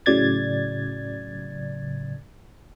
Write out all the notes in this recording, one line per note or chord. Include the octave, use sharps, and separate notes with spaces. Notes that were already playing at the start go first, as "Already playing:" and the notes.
A2 C#3 F#3 D5 G#6 A6